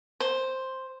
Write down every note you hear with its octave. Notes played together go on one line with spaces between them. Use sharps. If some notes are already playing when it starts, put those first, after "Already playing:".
C5